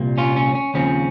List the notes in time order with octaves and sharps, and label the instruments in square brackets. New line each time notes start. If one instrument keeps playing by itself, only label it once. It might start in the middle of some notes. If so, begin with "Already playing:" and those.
Already playing: [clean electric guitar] C2 A#2 G3 A#3
C#4 F4
C#4
C#4
D#2 C#3 F3 C4 C#4